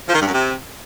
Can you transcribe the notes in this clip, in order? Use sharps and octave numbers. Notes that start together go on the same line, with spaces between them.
F3
D#3
G2
F#2
C3